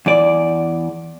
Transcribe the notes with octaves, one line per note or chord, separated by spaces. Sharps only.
E2 D5